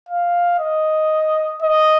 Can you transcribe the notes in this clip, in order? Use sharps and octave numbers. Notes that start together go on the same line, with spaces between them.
F5
D#5
D#5